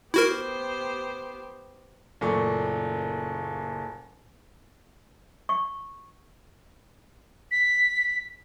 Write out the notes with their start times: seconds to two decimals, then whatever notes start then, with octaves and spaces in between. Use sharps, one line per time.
0.14 B3 E4 F#4 G4 A#4 C5
2.21 F#1 A#2 A3 C#6
5.49 C#6
7.51 B6